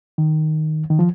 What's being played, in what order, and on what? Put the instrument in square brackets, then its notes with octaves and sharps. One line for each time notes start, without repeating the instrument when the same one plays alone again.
[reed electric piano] D#3
D#3
F3